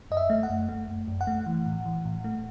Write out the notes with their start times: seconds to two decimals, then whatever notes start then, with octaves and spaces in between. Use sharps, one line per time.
0.11 F#2 D#5
0.17 E5
0.30 A3
0.43 F#5
0.50 F#2
0.69 A3
0.88 F#2
1.08 F#2
1.21 F#5
1.27 A3
1.46 E3
1.66 A2
1.85 E3
2.05 A2
2.24 A3